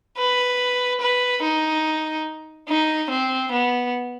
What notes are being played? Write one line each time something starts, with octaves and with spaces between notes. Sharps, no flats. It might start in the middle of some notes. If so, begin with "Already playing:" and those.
B4
B4
D#4
D#4
C4
B3